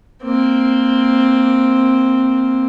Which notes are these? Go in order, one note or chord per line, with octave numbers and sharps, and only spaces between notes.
A#3 C4